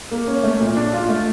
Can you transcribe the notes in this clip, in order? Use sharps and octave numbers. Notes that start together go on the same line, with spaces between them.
A#3
C#4
A3
A#2
D4
F4
A3